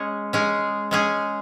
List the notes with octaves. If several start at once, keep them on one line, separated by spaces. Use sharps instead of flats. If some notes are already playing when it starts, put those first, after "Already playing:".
Already playing: G#3 C#4 G#4
G#3 C#4 G#4
G#3 C#4 G#4